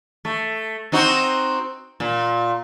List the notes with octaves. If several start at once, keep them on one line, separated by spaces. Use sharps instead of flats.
A3
C4 D#4 F#4
A#2